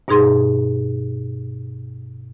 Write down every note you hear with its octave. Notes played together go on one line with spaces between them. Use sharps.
G2 B2 D#4 G#4 C6